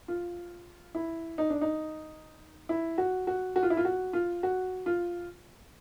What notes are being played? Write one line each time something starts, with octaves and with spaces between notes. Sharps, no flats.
F4
E4
D#4
D4
D#4
E4
F#4
F#4
F#4
F4
E4
F4
F#4
F4
F#4
F4